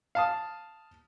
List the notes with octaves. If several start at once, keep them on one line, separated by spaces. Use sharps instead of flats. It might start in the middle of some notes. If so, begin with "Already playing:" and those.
F5 A5 D#6